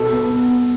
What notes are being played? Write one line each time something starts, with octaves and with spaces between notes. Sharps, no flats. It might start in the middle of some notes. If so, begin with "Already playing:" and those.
Already playing: B2 A4
B3
B3
B3